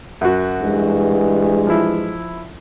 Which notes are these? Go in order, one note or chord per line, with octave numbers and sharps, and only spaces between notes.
F#2 F#4
G2 E3 G#3
F3 E4